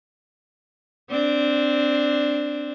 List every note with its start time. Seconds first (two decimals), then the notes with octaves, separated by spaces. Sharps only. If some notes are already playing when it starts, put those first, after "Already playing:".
1.10 C4 D4